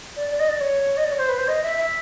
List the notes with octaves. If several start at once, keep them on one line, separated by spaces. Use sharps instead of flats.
D5
D5
D#5
D5
C#5
D#5
D5
C#5
C5
B4
C5
D#5
E5
E5